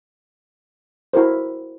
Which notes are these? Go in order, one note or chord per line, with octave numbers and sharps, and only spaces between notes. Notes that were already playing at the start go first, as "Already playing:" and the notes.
E4 F#4 A#4 C5